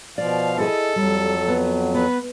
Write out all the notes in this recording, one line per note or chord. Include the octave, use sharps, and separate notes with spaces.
B2 F3 D5 F5
E4 G#4 A4 D#5
F2 F#3 G3
B3
B3 B4